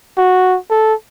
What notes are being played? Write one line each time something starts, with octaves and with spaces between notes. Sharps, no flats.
F#4
A4